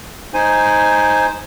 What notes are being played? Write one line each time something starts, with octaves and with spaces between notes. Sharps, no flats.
D#4 C5 G#5